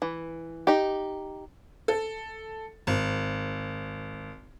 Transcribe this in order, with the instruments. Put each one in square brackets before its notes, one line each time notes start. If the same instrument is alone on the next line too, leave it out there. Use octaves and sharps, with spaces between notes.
[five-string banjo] E3
D#4 G4
[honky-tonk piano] A4
G#1